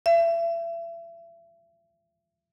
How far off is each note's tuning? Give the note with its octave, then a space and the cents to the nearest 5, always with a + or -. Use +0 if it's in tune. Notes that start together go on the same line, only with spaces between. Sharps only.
E5 +35